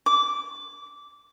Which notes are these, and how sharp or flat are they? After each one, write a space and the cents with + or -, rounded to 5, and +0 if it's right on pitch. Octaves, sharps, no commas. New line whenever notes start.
D6 -15